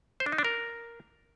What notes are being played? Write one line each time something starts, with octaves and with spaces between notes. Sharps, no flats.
C5
D4
D#4
D4
A#4